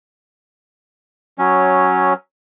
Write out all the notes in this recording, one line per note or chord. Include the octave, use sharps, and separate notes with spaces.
F#3 C#4